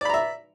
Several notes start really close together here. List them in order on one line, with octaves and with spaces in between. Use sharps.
D5 B5 A#5 E5